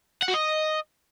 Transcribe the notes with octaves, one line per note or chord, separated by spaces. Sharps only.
F#5
F#4
D#5